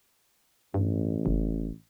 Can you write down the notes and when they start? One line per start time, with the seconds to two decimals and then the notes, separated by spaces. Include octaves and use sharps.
0.74 A1 G2
1.26 F#1